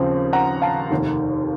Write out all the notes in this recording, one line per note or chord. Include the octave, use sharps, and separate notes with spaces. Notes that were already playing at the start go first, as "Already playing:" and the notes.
Already playing: D#2 C#3 F3 C4
F#5 A#5
F5 A5
F1 D#2 D#3